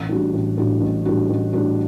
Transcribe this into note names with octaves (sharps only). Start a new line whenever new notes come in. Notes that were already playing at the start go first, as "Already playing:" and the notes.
Already playing: A1
A2 G3 D4 F#4
A1
A2 G3 D4 F#4
A1
A2 G3 D4 F#4
A1
A2 G3 D4 F#4